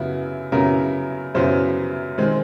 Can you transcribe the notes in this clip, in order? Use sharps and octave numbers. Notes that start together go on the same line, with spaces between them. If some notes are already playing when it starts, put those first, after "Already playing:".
Already playing: F#2 C#3 F#3 B3 E4
F#2 C#3 F#3 B3 E4 A#4
F#2 C#3 F#3 B3 E4 C5
D#3 G#3 C4